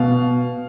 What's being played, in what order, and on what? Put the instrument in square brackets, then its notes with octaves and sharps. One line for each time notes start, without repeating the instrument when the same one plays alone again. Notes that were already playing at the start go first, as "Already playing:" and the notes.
Already playing: [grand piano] B2 F5